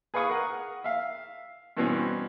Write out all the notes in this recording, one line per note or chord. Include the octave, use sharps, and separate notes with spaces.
G#4 B4 F5 C#6 D#6
A#4 F#5
E5 F5
G2 B2 E3 C4 C#4